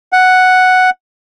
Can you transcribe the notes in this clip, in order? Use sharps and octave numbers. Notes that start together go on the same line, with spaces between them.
F#5